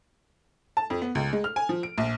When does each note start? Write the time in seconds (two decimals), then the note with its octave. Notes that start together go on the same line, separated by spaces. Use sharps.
0.77 A5
0.90 F2
1.02 B3
1.15 C#2
1.33 G#3
1.44 F6
1.56 G#5
1.69 F3
1.83 D7
1.98 A#1